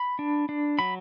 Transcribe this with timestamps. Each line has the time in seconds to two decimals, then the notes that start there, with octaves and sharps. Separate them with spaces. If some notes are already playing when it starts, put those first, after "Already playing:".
Already playing: B5
0.19 D4
0.49 D4
0.79 F#3 B5